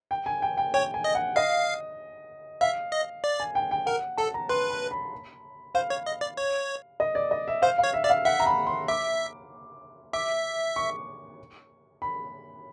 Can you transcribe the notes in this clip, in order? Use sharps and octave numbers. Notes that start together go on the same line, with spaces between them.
G5
G#5
G5
G5
C#5 G5
G#5
D#5
F#5
D#5 F5
E5 F5
D#5
D5
G#5
G5
G5
A#4 F#5
A4 A5
A#5
B4 C6
B5
B5
C5 F5
C#5
D#5
D5
C#5
D#5
D5
D#5
E5
C5 F5
F5
C#5
E5
D5 E5
F5
E5 F#5
A#5
B5
C6
E5 D6
E5 D6
C#6
B5